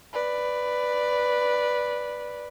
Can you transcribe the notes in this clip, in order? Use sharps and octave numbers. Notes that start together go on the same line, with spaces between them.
B4 D5